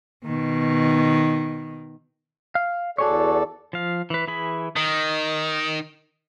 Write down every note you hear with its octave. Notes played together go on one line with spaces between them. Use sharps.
B2 D#3
F5
E2 F#4 G#4 A4 C#5 D5
F3 F5
E3 B4
E3 G#4 B5
D#3 D#5